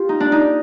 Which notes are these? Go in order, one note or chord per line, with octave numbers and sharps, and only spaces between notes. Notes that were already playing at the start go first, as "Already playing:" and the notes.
Already playing: F4 G4
D#4
D4
D#4